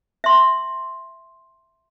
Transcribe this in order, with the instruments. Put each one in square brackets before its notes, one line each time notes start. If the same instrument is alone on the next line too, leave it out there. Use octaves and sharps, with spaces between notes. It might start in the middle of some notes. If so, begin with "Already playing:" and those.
[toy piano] E5 C6